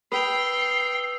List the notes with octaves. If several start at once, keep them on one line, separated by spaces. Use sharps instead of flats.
B4 G5 D#6 E6 C7 F7